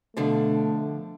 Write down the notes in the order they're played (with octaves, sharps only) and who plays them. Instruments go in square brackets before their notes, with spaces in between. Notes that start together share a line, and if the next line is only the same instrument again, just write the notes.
[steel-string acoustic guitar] B2 D3 F3 [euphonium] A3